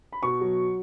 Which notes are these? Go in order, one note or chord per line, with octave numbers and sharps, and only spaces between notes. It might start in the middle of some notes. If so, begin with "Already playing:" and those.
B5
B2 C#6
F#3